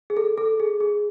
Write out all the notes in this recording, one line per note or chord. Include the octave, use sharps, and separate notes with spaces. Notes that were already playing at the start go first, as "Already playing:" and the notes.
G#4
A4
A4
G#4
G#4